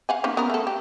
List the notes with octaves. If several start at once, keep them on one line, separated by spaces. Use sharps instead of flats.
F5 F#5 G#5
A#3 C#4 D#4
B3 A#4
A3 A4
G4